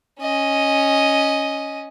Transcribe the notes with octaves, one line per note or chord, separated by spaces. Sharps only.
C#4 D#5